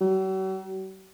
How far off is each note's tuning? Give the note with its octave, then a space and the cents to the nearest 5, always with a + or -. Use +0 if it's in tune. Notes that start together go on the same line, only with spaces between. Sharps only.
F#3 +45